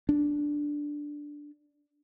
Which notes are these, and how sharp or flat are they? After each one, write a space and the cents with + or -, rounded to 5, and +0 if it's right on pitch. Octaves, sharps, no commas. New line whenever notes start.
D4 +0